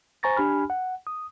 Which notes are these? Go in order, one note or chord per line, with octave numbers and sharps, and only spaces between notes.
C5 G#5 A#5 C#6 A6 A#6
D4 G4 G#5 B5 F6
F#5
D#6